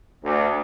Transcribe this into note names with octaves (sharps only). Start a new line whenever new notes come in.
D2